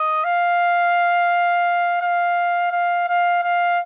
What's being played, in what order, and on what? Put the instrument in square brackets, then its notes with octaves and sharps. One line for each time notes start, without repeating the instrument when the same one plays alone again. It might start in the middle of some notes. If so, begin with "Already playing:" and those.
Already playing: [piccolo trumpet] D#5
F5
F5
F5
F5
F5